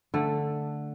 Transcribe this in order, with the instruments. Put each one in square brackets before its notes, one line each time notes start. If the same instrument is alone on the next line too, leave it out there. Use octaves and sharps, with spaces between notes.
[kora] D3 A3